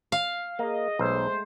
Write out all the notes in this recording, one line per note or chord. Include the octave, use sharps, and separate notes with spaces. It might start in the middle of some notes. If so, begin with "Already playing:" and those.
F5
A#3 G#4 D#5
B1 G#3 A3 C5